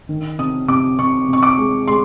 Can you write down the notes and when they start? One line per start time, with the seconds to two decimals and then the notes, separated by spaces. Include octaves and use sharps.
0.09 D#3
0.38 C3 D#6
0.68 C3 D6
0.99 C3 C#6
1.29 C3 C#6
1.43 D6
1.58 G#3
1.88 G#3 C6